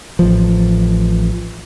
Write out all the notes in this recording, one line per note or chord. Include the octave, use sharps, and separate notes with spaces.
A1 F3